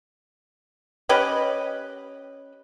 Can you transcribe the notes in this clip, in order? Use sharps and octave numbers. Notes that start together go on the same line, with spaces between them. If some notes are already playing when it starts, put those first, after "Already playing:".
C#4 G4 B4 D#5